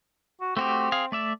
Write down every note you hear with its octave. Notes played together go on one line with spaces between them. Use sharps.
F#4
A3 C4 F#4 G4
G#4 F5
A3 D5 E5